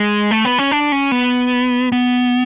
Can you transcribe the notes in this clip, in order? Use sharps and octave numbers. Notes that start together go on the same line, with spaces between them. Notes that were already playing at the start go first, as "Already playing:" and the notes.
Already playing: G#3
A3
B3
C#4
D4
C#4
B3
B3